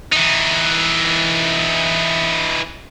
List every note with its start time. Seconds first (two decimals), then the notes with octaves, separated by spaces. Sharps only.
0.13 E3 D#4